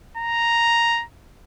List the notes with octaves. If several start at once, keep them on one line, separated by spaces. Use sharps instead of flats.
A#5